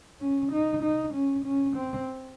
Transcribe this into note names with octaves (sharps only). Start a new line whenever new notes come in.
C#4
D#4
D#4
C#4
C#4
C4